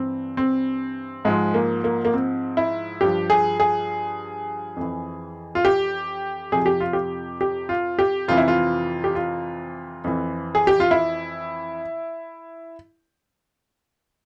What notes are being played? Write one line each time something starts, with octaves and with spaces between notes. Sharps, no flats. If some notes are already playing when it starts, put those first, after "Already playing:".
Already playing: G2 E3 C4
C4
G#2 F3 G#3
A#3
A#3
A#3
C4
E4
G2 F3 G4
G#4
G#4
F2 E3
F4
G4
F2 C3 F3 G#4
G4
F4
G4
G4
F4
G4
F2 C3 E3 F4
E4
F4
G4
F4
F2 E3
G#4
G4
F4
E4